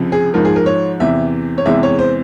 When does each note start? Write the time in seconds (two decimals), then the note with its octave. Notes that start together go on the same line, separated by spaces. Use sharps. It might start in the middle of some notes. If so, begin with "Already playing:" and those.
Already playing: C#2 C3 F3
0.12 G#4
0.33 G#2 F3 G#3 A#4
0.45 G#4
0.56 A#4
0.66 C#5
1.00 E2 C3 E3 E5
1.58 C#5
1.65 E2 C3 E3 G#3 E5
1.83 C#5
1.99 C5